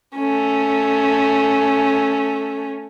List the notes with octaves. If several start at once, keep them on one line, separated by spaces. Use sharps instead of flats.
A3 C#4